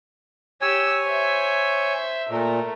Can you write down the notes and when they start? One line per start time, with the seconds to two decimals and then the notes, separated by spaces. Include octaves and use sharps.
0.61 G4 C#5 G#5 E6
1.05 C5 E5
2.30 A#2 A3 A#4